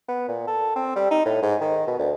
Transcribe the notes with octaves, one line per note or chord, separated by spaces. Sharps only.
B3
A#2
A4
C4
G3
D#4
A2
G#2
D#3
B2
D2